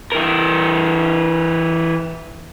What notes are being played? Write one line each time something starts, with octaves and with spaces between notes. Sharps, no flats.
E3 A#4